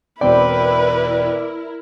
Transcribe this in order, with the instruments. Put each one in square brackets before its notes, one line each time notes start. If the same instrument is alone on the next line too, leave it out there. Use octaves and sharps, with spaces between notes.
[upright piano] E1 C4 G5 [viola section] E4 A#4 [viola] B4 [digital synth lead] D5